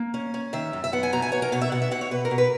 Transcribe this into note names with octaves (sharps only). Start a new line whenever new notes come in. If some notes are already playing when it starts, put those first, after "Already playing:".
Already playing: A#3
C#4
C#4
D#3 E5
F#2
E5
B3 F#5
G#5
B2 A#5
G#5
B3 C#5
A#4
B2 C#5
E5
B2 F#5
E5
B2 F#5
C#5
B2 B4
A#4
B2
B4